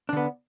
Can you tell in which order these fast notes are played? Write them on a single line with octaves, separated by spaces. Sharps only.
D4 D3 B3